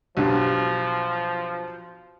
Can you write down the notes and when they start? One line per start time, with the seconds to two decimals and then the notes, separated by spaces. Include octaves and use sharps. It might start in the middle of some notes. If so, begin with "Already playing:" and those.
0.17 B1 G2 F3